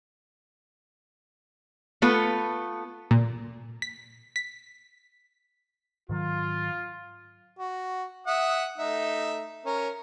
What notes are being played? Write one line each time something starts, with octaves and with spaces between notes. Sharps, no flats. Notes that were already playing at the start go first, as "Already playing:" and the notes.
A3 B3 F4 A4 B4
A#2
B6
B6
G#2 D#3 F#3 F4
F#4
E5 F#5 D#6
A3 D#4 E5
C#4 A#4